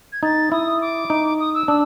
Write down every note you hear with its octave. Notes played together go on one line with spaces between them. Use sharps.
G#6
D#4 A6
E4 D#6
D6
D#4
D#6
E6
D4 E6